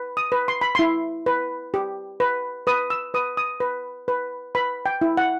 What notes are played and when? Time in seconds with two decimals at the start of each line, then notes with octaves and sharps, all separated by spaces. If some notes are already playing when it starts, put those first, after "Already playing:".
Already playing: B4
0.17 D#6
0.32 B4
0.48 C6
0.61 B5
0.75 E4 C6
1.26 B4
1.74 G4
2.20 B4
2.67 B4 D#6
2.90 E6
3.14 B4 D#6
3.37 D#6
3.60 B4
4.08 B4
4.55 B4 B5
4.86 G5
5.01 E4
5.17 F#5